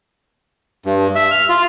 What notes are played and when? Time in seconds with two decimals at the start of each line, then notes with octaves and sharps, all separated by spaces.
0.86 G2
1.15 E5
1.31 F6
1.49 F4